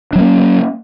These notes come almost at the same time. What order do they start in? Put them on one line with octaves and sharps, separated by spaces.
D4 F#3 C#4 A#3